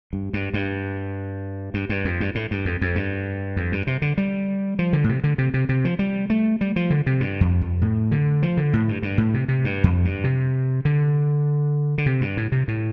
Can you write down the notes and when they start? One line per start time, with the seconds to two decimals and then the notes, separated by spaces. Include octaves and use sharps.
0.13 G2
0.33 G2
0.54 G2
1.74 G2
1.89 G2
2.05 F2
2.20 G2
2.35 A2
2.51 G2
2.65 F2
2.81 F2
2.95 G2
3.56 F2
3.72 G2
3.87 C3
4.02 D3
4.18 G3
4.79 F3
4.93 D3
5.04 A2
5.09 C3
5.24 D3
5.38 C3
5.54 C3
5.69 C3
5.85 F3
5.99 G3
6.30 A3
6.61 G3
6.76 F3
6.90 D3
7.06 C3
7.20 G2
7.41 F2
7.61 F2
7.81 A2
8.11 D3
8.43 F3
8.57 D3
8.73 A2
8.89 G2
9.03 G2
9.18 A2
9.34 C3
9.48 C3
9.64 G2
9.84 F2
10.05 G2
10.24 C3
10.85 D3
11.98 D3
12.06 C3
12.21 G2
12.37 A2
12.52 C3
12.68 A2